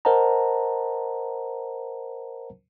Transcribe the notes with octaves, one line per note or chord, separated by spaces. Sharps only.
A#4 C5 D#5 F#5 A5 A#5